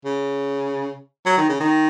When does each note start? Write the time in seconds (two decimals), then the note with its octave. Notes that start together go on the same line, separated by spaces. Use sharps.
0.05 C#3
1.26 F#3
1.37 D#3
1.49 C#3
1.60 D#3